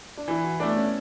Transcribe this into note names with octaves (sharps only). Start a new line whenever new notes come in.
D4
E3 E4
F#4
A3 B3 D4
C#4